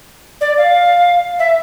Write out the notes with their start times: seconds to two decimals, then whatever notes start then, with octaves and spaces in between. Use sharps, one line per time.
0.41 D5
0.58 F5
1.39 E5